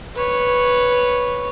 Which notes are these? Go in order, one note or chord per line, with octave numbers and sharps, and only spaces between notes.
B4 C#5